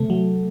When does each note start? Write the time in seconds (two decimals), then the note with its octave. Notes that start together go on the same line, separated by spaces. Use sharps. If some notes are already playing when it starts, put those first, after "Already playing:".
Already playing: C3 A3
0.10 F#3